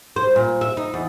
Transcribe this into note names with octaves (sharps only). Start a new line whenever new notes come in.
C5
A#2
E5
D#4
E2